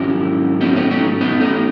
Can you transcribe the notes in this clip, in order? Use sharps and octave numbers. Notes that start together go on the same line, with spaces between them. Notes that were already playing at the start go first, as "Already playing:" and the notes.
Already playing: G#2 D#3 F#3 C#4 E4
B3 D#4
A3 C#4
A3 C#4
B3 D#4
A3 C#4